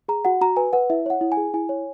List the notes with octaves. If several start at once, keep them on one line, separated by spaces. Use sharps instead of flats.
G#4 A#5
F#4 F#5
F#4 A#5
B4 G#5
B4 F#5
E4 E5
C#5 F#5
E4
G#5
G#4
E4 G#5
C#5